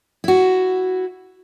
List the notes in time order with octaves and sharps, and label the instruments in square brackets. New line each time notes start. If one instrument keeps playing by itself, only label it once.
[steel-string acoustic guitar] E4 F#4